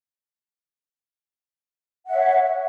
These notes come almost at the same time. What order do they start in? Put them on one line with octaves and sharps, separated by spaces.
F#5 E5 C#5